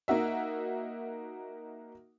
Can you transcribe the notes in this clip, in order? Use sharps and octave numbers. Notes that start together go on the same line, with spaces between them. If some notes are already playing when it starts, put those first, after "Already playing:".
A#3 D#4 F#4 E5